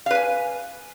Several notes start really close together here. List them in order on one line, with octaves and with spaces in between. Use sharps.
F5 B4 G#5